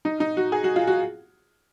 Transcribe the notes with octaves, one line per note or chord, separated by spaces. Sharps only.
D#4
D#4
F#4
G#4
F#4
F4
F#4